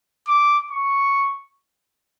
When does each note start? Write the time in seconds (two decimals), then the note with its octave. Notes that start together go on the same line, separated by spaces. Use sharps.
0.27 D6
0.71 C#6